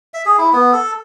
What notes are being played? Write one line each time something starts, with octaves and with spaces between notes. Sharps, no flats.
E5
G#4
E4
B3
A4